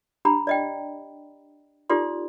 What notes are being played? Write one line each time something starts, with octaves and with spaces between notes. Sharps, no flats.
D4 G4 A#5 B5
D5 D#5 G5
D#4 F4 G4 A4 D5 C6